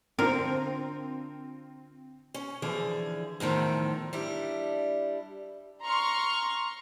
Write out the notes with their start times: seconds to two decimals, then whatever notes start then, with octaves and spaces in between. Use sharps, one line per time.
0.19 D3 C4 F4 A#4 C5
2.34 C#4
2.62 D3 E3 F3 G#4
3.40 E2 A2 D#3 F3
4.13 G3 D4 E4
5.84 A#5 C6 C#6 F6